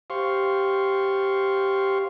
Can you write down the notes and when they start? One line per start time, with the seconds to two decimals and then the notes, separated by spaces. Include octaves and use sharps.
0.10 G4 C5 F5 C6 C#6